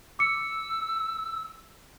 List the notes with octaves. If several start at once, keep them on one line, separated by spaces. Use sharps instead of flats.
D6 E6 C#7